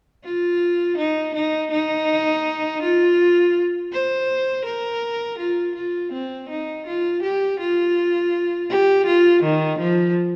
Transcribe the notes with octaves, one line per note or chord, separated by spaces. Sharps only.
F4
D#4
D#4
D#4
F4
C5
A#4
F4
F4
C4
D#4
F4
G4
F4
G4
F4
D#3
F3